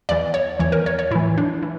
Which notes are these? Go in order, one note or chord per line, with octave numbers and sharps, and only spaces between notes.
E2 E3 D5
C#5
E2 E3 C#5
A#4
C#5
C#5
A2 E3 E4
D4
E3